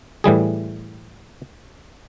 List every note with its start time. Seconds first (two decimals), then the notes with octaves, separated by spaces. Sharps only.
0.24 A2 E3 G3 G#4